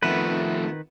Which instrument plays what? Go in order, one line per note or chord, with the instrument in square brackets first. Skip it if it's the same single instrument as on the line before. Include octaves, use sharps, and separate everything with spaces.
[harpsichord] F2 B3 E4 [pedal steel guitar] D#3 B4 [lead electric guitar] F3 A3